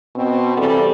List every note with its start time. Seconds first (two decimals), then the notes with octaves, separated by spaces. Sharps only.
0.16 B2 C4
0.57 E2 C3 G3 A4